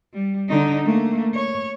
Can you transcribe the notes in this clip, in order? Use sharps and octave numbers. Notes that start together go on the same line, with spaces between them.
G3
D3 D#4
A3 A#3
C#5